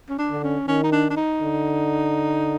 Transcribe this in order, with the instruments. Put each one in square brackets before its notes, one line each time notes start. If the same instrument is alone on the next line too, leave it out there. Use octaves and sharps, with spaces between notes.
[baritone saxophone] C#4
D4
[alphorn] D3
[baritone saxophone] C#4
[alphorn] D#3 [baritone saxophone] C#4
[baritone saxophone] D#4
D4
D4
D#4
[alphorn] D3